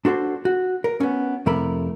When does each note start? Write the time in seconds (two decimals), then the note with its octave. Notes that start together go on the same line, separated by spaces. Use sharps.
0.05 D4 F#4 A4 C5
0.45 F#4
0.84 A#4
1.00 B3 C#4
1.46 F2 C3 A3 E4 A#4 B5